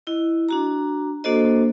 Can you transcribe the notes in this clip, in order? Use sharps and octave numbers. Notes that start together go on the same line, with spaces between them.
E4 D#5
D4 F#4 A#5
A#3 D4 F#4 A4 C5 D#5